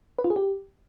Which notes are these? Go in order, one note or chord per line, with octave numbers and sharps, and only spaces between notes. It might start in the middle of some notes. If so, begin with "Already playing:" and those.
B4
F4
G#4
G4